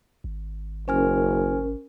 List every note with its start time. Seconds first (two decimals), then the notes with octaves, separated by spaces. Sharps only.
0.24 G#1
0.88 F#1 C#4 A#4 C5 G#5 F6